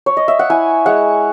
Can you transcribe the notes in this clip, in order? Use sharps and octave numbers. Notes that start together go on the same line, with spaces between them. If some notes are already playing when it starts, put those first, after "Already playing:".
C#5
D#5
E5
F#5
E4 G#5
G#3 F#5